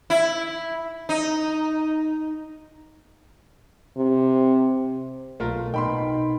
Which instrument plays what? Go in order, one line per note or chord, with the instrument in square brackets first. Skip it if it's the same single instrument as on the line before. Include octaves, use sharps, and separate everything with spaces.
[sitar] E4
D#4
[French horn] C3
[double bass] B1 [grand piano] A3 F4 A#4
[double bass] B2 [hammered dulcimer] D#3 [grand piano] G5 B5 C6